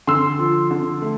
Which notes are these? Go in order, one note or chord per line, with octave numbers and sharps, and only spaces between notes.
D3 C6 E6
F3
D3
A3